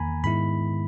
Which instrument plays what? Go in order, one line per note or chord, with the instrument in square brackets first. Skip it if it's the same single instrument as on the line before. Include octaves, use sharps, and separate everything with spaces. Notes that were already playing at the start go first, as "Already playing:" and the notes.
Already playing: [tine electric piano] E2 D#3 A#3 G#5 A#5 B5
G#2 D#3 G#3 B3 E4 B5